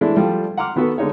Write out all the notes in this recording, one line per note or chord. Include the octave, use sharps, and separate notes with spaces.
E3 G#3 A3 D4 E4 A4
F3 G3 A3
F#5 A#5 C6 D6 F6
D#3 B3 F#4 A4 B4
D3 G#3 D#4 C#5